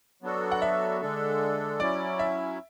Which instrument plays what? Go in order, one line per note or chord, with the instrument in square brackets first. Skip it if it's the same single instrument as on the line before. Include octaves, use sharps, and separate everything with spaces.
[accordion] F#3 B3 D4 F#4 A4
[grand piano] F#5
E5
[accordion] D3 G#3 D4 A4
[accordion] F#3 C#4 E4 [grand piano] D5
[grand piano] E5